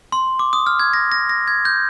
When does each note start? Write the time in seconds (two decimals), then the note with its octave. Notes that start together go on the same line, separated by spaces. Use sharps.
0.12 C6
0.39 D6
0.53 D#6
0.67 F6
0.79 G#6
0.93 A#6
1.12 A#6
1.29 A#6
1.48 G#6
1.65 G6